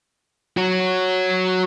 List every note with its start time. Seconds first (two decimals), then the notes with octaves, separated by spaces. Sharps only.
0.57 F#4 C#5